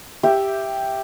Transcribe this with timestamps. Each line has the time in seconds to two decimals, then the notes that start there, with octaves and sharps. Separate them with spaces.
0.23 G4 E5